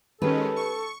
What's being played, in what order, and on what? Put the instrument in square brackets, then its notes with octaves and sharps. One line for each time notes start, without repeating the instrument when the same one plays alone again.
[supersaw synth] D#3 G#3 C#4 [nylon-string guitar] G4 B4 [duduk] A4
[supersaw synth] C#6